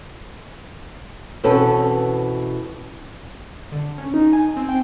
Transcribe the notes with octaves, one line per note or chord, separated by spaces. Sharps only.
B2 E3 C4 C#4 A4
D3
C#4
D#4
G#5
C4
G5